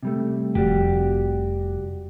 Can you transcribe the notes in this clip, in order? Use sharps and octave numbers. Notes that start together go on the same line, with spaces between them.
C3 G3 A3
F1 G3 F#4 G4